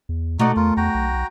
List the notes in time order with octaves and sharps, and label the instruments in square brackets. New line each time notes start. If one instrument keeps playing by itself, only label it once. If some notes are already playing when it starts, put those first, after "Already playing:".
[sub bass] E2
[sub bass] B2 [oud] A3 D5 [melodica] D#4 F#4
[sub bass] E2 [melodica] F4 A#4
[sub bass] E2 [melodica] F#4 G5 A#5
[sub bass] B1
B1